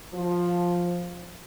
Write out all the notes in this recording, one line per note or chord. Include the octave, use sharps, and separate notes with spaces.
F3